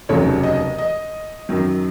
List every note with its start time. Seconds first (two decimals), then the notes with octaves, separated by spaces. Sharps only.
0.09 F1 D#2 C#3 F#3 C#5
0.43 D#5
0.78 D#5
1.49 F#2 D#3 F#3